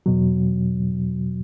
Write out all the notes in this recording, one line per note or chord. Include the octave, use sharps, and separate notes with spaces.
E2 B2 F#3